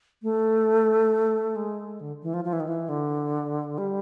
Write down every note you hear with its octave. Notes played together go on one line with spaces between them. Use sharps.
A3
G#3
D3
E3
F3
F3
E3
D#3
E3
D3
G3